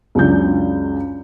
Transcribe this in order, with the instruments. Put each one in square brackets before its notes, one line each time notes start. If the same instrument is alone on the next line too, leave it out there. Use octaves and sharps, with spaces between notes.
[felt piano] C#2 F#2 D4 G6